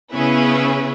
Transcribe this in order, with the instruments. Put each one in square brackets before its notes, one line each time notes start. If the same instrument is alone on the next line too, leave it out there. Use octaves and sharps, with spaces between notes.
[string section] C#3 B3 C#4 E4 G#4 B4